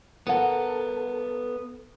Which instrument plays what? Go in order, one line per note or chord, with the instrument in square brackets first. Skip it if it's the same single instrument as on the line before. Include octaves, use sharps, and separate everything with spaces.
[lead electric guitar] B3 A4 [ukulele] A#4 F#5